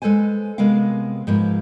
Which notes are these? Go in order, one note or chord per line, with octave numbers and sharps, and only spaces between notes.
G#3 A4 B4 C5 G#5
C3 G#3 B3 A#4 F5
G#2 F3 A#3 B4